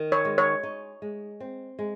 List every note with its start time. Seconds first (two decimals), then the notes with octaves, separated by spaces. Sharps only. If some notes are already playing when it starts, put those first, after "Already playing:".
Already playing: D#3
0.12 C#5
0.25 G#3
0.38 C#5
0.63 D#4
1.02 G#3
1.40 C4
1.79 G#3